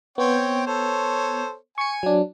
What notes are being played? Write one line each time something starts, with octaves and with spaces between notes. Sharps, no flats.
B3 C4 C#5 G5
A4 C5 C#5
G#5 C#6 C#7
F#3 D4